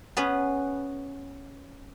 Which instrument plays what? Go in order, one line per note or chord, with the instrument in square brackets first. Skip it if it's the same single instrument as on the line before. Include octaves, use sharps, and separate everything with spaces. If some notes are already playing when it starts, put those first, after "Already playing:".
[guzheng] B3 C#4 G#4 B4